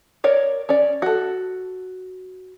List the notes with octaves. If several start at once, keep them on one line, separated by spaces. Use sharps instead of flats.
A#4 C#5 D5
C#4 D5
F#4 A4